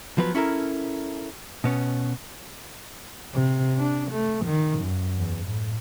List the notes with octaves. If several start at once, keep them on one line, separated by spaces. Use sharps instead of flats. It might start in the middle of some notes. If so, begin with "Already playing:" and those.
F3 F#3 B3 B4
C#4 E4 A4 A#4
B2 B3 C#4
C3
D4
A3
D#3
F#2
E2
A2